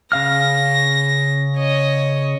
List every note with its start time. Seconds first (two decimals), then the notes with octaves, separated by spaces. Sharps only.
0.12 C#3 F5 F6 A#6
1.58 C#5 D#5